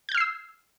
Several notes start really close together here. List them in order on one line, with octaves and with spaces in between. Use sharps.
G6 G#6 F6 C7 E6